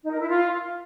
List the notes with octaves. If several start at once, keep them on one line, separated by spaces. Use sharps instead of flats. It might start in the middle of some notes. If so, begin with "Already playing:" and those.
D#4
A#4
E4
F4